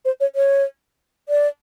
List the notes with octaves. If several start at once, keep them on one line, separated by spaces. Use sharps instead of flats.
C5
C#5
C#5
D5